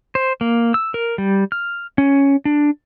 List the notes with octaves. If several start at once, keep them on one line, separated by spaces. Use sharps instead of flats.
C5
A#3
E6
A#4
G3
F6
C#4
D4